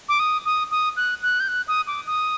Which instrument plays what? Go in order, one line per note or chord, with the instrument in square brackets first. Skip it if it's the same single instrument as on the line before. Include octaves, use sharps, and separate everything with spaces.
[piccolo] D6
D#6
D#6
D#6
F#6
F#6
G6
F#6
D#6
D6
D#6